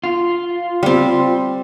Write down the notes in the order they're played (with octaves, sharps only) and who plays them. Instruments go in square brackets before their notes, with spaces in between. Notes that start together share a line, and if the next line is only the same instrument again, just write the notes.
[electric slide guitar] F4
[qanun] G3 C4